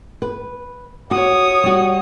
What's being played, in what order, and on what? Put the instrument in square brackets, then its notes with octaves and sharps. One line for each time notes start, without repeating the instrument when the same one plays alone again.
[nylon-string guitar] B4
[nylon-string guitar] F#4 [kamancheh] C#5 D#6
[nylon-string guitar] G3 F#4